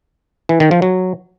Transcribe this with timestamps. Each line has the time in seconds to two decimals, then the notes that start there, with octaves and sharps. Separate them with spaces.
0.49 E3
0.60 D#3
0.71 F3
0.82 F#3